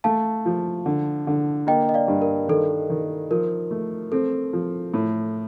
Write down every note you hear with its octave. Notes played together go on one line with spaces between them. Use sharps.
A3 F5 A5
F3
D3
D3
A#3 D#5 G5
D#5
D5 F5
G2
A#4
D#3 A4
D#3
F3 A#4
A3
C4 A4
F3
A2